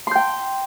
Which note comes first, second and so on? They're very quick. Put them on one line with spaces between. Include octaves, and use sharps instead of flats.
C6 G6 G5